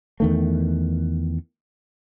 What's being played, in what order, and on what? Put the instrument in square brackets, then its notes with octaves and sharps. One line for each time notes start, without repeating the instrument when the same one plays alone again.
[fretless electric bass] E2 D#3 A3